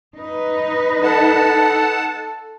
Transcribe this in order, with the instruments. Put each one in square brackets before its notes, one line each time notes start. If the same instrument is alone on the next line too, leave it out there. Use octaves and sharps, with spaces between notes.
[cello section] D#4 B4
[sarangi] A4 [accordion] F#5 A5